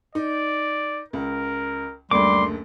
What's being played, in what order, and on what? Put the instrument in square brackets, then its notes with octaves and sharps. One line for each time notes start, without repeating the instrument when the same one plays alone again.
[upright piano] D#4 [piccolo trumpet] D5
[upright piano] C#2 [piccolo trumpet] A#4
[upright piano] F#1 D2 [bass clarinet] G3 [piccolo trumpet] C6 [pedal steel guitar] D6